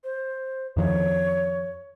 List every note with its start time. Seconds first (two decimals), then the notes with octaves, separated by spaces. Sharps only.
0.04 C5
0.77 F2 D#3 F3 C#5